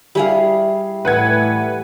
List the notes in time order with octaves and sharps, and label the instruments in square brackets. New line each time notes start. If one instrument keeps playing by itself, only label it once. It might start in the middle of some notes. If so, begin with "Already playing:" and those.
[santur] G3 [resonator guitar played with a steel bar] E4 G#4 F5
[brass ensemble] A2 E3 [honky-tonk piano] B4 F#5 G#6